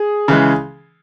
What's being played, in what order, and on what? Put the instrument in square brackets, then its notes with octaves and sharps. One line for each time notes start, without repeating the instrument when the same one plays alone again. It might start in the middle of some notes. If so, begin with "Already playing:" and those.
Already playing: [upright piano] G#4
[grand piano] C#3 E3 G#3